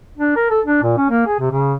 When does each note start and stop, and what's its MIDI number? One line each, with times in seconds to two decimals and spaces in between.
0.18 0.36 62
0.36 0.46 70
0.50 0.60 69
0.66 0.81 62
0.83 0.94 46
0.97 1.05 61
1.10 1.23 58
1.27 1.37 68
1.40 1.51 48
1.51 1.74 49